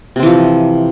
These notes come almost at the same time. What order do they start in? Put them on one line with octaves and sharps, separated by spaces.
C3 C4 E3 F3